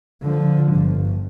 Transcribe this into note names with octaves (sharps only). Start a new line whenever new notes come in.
D3 F3
G1